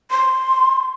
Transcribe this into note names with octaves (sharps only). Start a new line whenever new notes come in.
C6